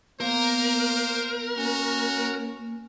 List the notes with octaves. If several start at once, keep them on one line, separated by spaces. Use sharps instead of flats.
A#3 B3 A#4 C5
A#3 C#4 F#4